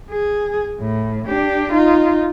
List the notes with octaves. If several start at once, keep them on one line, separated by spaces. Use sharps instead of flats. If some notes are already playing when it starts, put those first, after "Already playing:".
G#4
A2
D4 G4
D#4 F4